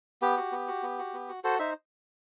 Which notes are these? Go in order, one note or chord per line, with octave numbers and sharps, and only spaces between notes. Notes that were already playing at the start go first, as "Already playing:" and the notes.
B3 G4
F#4
B3
F#4
B3
F#4
B3
F#4
F#4 A4 C5
D#4 C5 E5